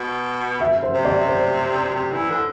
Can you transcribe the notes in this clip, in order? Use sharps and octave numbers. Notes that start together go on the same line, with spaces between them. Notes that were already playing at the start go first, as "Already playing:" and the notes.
Already playing: B2
E5
C5
C3
D5
C5
C3
E3
D3